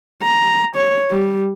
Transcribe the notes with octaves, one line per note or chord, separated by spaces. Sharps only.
A#5
C#5
G3